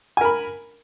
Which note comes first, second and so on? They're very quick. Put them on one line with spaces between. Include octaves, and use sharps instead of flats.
G#5 A#4 B5